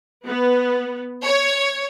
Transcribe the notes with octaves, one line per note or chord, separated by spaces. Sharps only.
B3
C#5